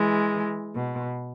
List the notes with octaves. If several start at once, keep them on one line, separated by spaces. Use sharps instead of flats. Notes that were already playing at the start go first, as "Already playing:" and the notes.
Already playing: E3 G#3
B2